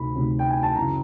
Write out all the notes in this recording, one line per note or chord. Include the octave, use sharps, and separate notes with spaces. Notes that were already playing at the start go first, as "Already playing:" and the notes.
Already playing: D2 C3 D#3 B5
D2 C3 D#3
G5
G#5
A5
F#2 C#3 E3 A#5